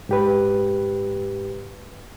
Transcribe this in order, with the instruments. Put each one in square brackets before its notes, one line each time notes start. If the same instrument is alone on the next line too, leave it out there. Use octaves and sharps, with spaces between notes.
[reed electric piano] G#2 G4 B4